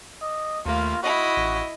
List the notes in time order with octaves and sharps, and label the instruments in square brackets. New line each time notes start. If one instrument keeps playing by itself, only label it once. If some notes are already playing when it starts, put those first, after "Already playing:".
[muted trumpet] D#5
[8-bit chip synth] D#2 A3 [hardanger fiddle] A#3 [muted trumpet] F4
[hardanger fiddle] E4 D#5 [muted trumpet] F#4 [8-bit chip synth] B5
[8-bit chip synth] A1